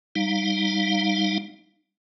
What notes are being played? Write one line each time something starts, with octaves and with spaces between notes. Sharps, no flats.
G3 D#4 F5